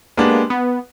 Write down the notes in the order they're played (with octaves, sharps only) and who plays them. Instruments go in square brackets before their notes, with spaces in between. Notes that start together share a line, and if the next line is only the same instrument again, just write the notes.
[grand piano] G#3 B3 D4 G4 [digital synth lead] A#3
[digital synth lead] B3